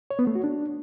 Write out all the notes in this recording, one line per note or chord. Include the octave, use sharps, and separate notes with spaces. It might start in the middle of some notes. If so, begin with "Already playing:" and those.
C#5
B3
A3
F#4
D4